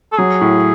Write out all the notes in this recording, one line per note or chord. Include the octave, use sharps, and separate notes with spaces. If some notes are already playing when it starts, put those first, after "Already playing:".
A4
F#3 G#4
A2